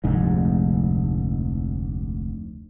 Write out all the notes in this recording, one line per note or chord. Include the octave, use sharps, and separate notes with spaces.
F1 D2 G#2